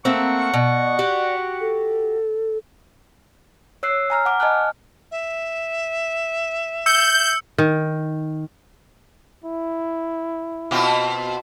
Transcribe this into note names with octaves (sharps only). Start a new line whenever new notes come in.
A3 A#3 C4 F#5 C#6
B2 D5
F#4 G4
A4
C#5 E6 F#6 C7
G#5 A#5 F6
F#5 D6 F6
D#5 G#5 A5 F6 F#6
E5
E6 G6 C#7
D#3
E4
B2 C4 F4